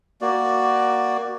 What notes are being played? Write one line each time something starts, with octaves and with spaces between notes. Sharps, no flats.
A#3 F#4 D5